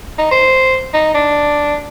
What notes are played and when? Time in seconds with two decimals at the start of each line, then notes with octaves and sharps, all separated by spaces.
0.18 D#4
0.31 C5
0.93 D#4
1.14 D4